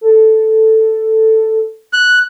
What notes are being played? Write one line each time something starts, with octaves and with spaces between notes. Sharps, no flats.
A4
F#6